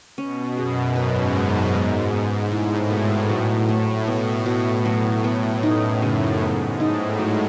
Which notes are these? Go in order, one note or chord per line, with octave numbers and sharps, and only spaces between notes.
B2 C#4
F#2 G#4
G#2 B4
G#3
G#3
B3
A2 E4
B2
F#3
A3
B2
B2
F#3
B3
F#2 D#4
C#3
G#2 B3
A2 D#4
F#3